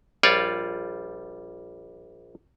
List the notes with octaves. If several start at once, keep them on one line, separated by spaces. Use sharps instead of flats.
A#1 G3 F4 C#5 D5